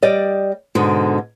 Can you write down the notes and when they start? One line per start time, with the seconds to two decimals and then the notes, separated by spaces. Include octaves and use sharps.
0.03 G3 D5 D#5
0.75 G#2 B2 D3